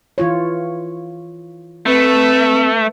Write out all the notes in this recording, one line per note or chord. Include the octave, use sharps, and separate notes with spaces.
E3 F4 C#5
A3 C4 B4 E5